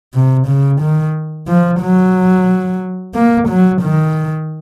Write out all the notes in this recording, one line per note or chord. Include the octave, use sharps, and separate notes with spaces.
C3
C#3
D#3
F3
F#3
A#3
F#3
D#3